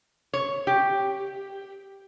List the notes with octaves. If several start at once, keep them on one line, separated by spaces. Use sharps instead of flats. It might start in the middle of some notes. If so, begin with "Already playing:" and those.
C#5
G4